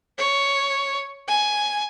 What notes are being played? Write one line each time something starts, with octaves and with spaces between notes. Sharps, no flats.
C#5
G#5